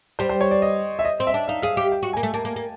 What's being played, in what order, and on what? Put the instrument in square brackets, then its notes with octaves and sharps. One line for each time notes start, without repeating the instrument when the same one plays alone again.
[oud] G3 [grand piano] C5
[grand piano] C5
C#5
D5
D#5
E5
D#5
[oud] C4
[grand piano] E5
[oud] D4
[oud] D#4 [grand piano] F5
[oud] G#4 [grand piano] F5
[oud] G4 [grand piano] F5
[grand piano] G5
[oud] F#4
[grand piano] G#5
[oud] A#3
A3
[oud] A#3 [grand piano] A5
[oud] A#3
A#3